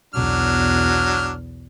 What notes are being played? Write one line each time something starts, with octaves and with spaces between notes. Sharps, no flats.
B1 E2 F#3 D4 F6